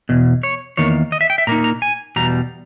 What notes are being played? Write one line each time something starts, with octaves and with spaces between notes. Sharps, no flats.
E2 B2
C#5
E2 D#3 A#3 C#5
D#5
E5
G5
E5
A#2 A#3 D#4 A#5
A#5
G#5
E2 B2 G3 A#5